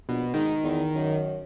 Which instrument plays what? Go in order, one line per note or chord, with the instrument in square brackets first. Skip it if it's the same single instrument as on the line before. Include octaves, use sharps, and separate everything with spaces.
[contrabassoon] A#1 [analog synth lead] B2
[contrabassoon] G#2 [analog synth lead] D#3
[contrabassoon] E2
F#2